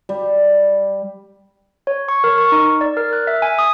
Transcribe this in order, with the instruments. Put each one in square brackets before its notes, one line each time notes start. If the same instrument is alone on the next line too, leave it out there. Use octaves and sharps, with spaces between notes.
[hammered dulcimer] G3
[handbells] C#5
C#6
A#4
C#6
D#4
D5
A#4
F#6
E5
G#5
D#6